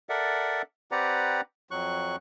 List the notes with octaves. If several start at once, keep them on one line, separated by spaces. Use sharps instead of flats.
A4 A#4 D5 E5 F#5
C4 G4 B4 D5 F#5 A#5
F2 F#3 C#6 F#6